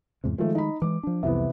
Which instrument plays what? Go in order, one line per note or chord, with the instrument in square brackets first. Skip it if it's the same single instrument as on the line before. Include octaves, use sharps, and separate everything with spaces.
[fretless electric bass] E2 G#2 C3
[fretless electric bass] D#3 G#3 [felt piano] F3 A3
[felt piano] D#4 B5
[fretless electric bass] E3 G#3 [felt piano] D6
[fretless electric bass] F3 D4
[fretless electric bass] C2 F2 [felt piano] C3 E3 B3